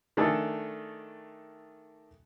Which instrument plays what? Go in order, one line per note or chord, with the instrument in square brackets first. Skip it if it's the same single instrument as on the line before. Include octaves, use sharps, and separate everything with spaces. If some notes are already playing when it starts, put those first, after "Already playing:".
[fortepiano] D#3 A3 D4 G#4 A4